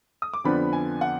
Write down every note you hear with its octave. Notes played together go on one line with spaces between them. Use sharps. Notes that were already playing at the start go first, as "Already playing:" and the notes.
D#6
D6
F2 D3 F3 B3 D4 B5
G#5
F#5